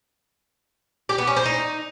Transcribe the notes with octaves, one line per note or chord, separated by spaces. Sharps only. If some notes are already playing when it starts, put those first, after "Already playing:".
G4
B3
C#4
C5
D#4